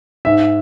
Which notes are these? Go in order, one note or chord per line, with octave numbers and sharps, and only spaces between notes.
G#2 E5